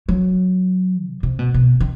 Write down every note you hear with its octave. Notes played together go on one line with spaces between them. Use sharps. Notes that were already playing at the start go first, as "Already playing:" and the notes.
F#3
C3
C3
B2
B2
D#3